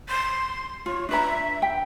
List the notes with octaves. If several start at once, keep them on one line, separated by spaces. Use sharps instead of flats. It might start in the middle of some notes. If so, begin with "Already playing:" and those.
C6
F4 C#5
D4 B4 E5 A#5
G5